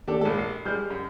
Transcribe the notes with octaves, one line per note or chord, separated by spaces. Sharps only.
D#2 D4 G4 A4
A#1 G#2 A4
C7
G3 G#3 F6 G6
F#2